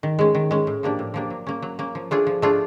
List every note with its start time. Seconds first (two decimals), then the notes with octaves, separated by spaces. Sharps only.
0.03 D#3
0.19 G#3 C#4
0.35 D#3
0.51 G#3 C#4
0.67 A2
0.83 F3 A#3 D4 G4
0.99 A2
1.14 F3 A#3 D4 G4
1.30 F#3
1.47 A#3 C#4
1.62 F#3
1.79 A#3 C#4
1.95 F3
2.11 A3 D4 F4 G#4
2.27 F3
2.42 A3 D4 F4 G#4